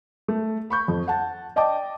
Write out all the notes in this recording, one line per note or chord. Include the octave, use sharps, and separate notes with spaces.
A3
B5 C#6 G6
F2
F#5 A5
D5 D#5 G5 A5 D6